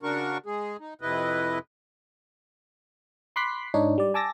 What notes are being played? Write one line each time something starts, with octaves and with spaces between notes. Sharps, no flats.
C#3 D4 F#4 A#4 C#6
G#3 G#4
D#4
F2 C3 E4 B4 D#5
B5 C6 D6 F#6 B6 C7
G#2 D4 D#4 C#5
G3 D5
G#5 A5 D6 E6 A6 A#6